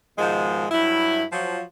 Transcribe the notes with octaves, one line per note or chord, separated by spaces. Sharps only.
G#2 B2 D#3 F3 G#3
G2 F#3 E4
F3 F#3